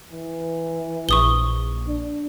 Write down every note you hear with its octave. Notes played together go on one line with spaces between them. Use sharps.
E3
A#1 C#6 D#6 G7
D4